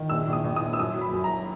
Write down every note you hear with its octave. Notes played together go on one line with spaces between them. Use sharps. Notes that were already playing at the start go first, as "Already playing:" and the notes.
Already playing: D#3
A#1 E6
A#1 D#6
A#1
D#6
A#1
E6
F#2 D#6
F#3
B5
F#2
A#5